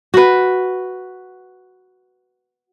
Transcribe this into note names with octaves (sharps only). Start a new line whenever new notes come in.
F#4 B4